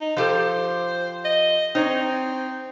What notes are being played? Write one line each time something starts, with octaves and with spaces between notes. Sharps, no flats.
D#4
F3 G4 A4 C5
D#5
C4 D#4 C#5